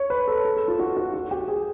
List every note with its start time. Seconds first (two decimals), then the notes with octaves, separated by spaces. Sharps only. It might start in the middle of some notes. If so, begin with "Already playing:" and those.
Already playing: C#5
0.10 B4
0.28 A4
0.45 A4
0.57 A4
0.68 F4
0.80 F#4
0.97 F#4
1.14 F#4
1.31 G4
1.48 G#4